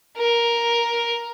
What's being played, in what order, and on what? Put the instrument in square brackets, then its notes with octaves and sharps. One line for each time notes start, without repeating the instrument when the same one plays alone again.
[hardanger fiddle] A#4